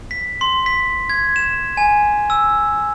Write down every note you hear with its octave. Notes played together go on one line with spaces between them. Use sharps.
B6
C6
B6
G#6
E7
G#5
E6